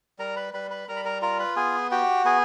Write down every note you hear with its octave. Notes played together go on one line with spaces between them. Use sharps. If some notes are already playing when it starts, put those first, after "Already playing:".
G3 A#4 A#5
B4 B5
G3 B4 B5
B4 B5
G3 A#4 A#5
B5
A#4 A#5
F4 A#4 A#5
B4 B5
B3 G#4 G#5
F#4 G4 G5
B3 G#4 G#5